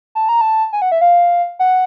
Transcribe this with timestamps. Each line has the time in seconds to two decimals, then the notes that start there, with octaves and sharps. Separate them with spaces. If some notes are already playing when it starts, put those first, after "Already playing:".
0.15 A5
0.29 A#5
0.41 A5
0.73 G#5
0.82 F#5
0.92 E5
1.01 F5
1.59 F#5